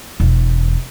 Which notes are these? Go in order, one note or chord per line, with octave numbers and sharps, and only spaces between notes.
E1 E2